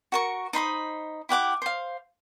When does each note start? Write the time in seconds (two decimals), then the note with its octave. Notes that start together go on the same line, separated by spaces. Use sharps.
0.12 F#4 A#4 C#6
0.53 D#4 C5 B5 D#6
1.29 E4 G4 F#5 D6
1.62 C5 F5